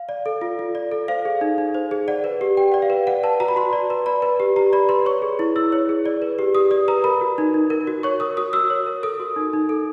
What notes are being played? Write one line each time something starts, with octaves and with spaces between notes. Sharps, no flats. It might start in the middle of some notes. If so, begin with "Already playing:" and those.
Already playing: F5
D5
A4
F4
F4
D5
A4
C5 F5
G#4
D#4
D#4
C5
G#4
D5 F#5
B4
G4
G4 G5
D5 F#5
F5
B4
D5 F#5
B4 A5
F#4 A#5
B5
F#4 C6
D5
B4
D5 B5
B4
G4
G4 A#5
D5 B5
B4 C6
C#5 C#6
G#4
E4
E4 E6
C#5
G#4
D5
B4
G4
G4 D#6
D5 D#6
B4 A#5
A#4 B5
F#4
D#4
D#4
A#4
F#4
C#5 C#6
A#4 D#6
F#4 D#6
F#4 E6
C#5
A#4
A4 D#6
F#4
D#4
D#4
A4